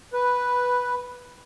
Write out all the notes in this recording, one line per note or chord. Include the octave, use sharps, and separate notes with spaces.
B4